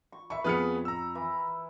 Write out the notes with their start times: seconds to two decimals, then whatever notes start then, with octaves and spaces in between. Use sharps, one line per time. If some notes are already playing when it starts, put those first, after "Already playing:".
0.12 C#6
0.30 E5 B5 C#6
0.44 F2 B3 G#4 B4 F6 C#7
0.85 A#5 E6
1.15 E3